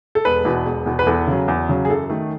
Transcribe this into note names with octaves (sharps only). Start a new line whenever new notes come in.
A4
E1 B4
E2 B2
E1
E2 B2
B4
E2 A4
C#3 F#3
E2
C#3 F#3
G#4
F#2 A4
D#3 A3